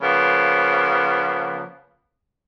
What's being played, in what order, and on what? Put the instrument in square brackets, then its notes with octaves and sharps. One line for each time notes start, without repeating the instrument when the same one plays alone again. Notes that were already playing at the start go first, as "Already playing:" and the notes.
[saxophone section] C#3 F3 A#3 B3